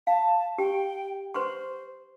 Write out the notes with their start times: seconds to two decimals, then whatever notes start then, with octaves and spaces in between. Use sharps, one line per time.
0.07 F5 A5
0.58 G4 G5
1.34 B4 C5 C6 C#6